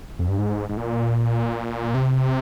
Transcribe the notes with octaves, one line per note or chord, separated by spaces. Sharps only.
F2
G2
G#2
G#2
A#2
C3